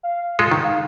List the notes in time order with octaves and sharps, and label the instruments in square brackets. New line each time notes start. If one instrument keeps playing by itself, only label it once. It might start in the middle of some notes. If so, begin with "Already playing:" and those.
[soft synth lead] F5
[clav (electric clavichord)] G#3 F4 A4
D#3
[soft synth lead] F5